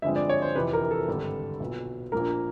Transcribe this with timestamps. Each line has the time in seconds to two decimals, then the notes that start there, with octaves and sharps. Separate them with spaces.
0.02 G2 D3 F3 G#3 C4 E5
0.16 D5
0.29 C#5
0.42 C5
0.55 F2 C3 E3 B4
0.73 A#4
0.91 A4
1.07 G#1 G2 D3 G3
1.60 B1 A#2 F#3 B3
2.12 A#1 A#2 F3 A#3 A#4